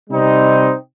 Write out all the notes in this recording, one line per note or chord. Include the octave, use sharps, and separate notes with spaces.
C3 G3 C4 D#4